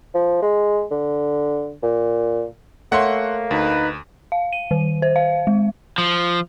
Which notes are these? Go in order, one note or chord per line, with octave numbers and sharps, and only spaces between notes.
F3
G#3
D3
A#2
A3 A#3 C#5 E5 F#5 C6
D2 D#4 B4
F5
D#7
D#3
C5
F5
G#3
F3